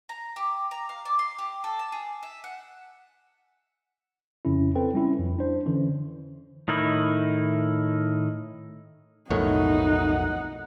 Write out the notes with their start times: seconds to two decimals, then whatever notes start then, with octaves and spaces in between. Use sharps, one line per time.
0.09 A#5
0.36 G4
0.71 A#5
0.89 F5
1.05 D5
1.19 C6
1.39 G4
1.64 A4
1.79 A5
1.92 G#4
2.23 E5
2.44 F#5
4.45 F2 C#3 C#4 E4
4.75 C4 A4 B4 G5
4.94 G3 C#4 E4
5.19 F2
5.39 D4 C5
5.66 D3 E3 C#4
6.68 A2 D#3 D#4 E4
9.30 B1 F2 A2 D#3 A3 D#4 C#5 F#5